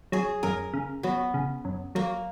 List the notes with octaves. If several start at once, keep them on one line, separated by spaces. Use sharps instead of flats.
F#3 G#4
F#2 A#4
C#3
F#3 B3
C#3
F#2
F#3 A#3